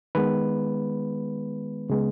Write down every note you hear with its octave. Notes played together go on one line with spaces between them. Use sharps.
D#3 G#3 B3 B4
C#3 G#3 B3